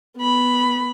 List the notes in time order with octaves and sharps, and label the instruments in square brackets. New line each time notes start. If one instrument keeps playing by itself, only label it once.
[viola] B3 B5